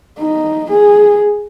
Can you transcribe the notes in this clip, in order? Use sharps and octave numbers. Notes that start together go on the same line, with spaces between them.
D#4
G#4